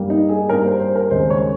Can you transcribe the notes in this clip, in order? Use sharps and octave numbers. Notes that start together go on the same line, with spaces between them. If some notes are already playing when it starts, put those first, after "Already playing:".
Already playing: G2 G3 A#3
D#4
G#4
G2 G3 A#3 A#4
C5
C5
A#4
D#2 C#3 G#3 C4 C5
C#5